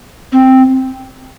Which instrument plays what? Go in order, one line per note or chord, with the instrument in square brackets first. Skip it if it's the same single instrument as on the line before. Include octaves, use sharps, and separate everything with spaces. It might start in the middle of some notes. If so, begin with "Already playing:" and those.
[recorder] C4